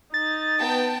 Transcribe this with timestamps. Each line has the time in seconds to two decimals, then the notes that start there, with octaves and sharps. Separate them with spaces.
0.14 D#4 A6
0.58 B3 G5 A5